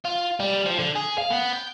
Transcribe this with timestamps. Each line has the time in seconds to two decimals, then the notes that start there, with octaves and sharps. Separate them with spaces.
0.05 F4
0.40 G3
0.66 F3
0.79 D3
0.95 G#4
1.18 F5
1.30 B3
1.53 G5